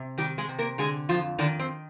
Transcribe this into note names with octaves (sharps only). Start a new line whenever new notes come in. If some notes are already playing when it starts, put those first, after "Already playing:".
Already playing: C3
D#3 G3 G4
G#3 G#4
C3
A#3 A#4
D3 G#3 G#4
F2 F3 F4
D3 D#3 D4
C4